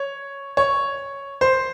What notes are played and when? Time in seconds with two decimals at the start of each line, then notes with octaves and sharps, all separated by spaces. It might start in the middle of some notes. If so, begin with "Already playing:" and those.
Already playing: C#5
0.57 C#5
1.41 C5